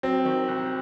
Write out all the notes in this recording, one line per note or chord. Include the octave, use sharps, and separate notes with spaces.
F#3 C4
D#3
C2